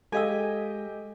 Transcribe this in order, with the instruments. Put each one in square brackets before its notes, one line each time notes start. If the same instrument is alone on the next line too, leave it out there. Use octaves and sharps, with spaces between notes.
[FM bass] G#3 [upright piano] G4 D#5 G5 [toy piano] A4 F5 E6 [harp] G#5